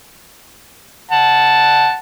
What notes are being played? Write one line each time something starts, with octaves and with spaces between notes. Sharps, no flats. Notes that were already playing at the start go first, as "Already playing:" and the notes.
F#5 A5